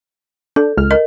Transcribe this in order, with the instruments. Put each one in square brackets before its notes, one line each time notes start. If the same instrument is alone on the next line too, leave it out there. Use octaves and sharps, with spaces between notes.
[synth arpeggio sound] D4 [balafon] A4
[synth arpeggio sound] C#2 F6
[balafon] A#4 D#5